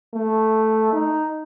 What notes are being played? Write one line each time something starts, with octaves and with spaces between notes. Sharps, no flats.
A3
D#4